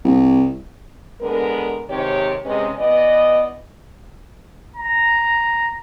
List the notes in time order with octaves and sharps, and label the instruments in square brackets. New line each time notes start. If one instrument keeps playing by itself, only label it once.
[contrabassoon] C2
[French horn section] D3 G#3 B3 A#4
G#2 C3 D#3 G4 C#5
G#2 C3 G#3 C#4 B4 D#5
E3 B3 D5 D#5
[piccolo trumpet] A#5